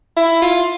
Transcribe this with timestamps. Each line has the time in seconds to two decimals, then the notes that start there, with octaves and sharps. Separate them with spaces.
0.17 E4
0.42 F4